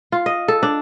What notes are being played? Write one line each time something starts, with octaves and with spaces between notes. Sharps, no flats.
F4
D#5
A4
D4